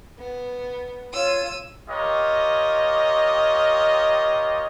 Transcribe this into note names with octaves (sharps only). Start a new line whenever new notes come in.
B3
F4 C#5 E6 D#7
F4 G4 A#4 C#5 D#5